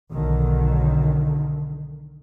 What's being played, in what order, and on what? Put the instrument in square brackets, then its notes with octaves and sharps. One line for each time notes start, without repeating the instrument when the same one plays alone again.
[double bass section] B1 D3 D#3